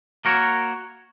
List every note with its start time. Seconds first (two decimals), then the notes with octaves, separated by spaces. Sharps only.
0.25 A#3 F#4 A#4 C#5